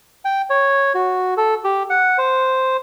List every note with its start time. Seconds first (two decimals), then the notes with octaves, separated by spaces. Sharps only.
0.25 G5
0.50 C#5
0.95 F#4
1.37 A4
1.64 G4
1.90 F#5
2.18 C5